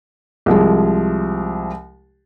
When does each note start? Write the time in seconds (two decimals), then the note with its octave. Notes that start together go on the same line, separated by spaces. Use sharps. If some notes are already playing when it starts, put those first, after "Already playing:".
0.46 C2 F3 G#3